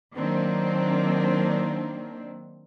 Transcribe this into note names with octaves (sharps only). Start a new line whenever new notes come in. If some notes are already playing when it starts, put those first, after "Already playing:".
D#3 F#3 A#3 C4 D4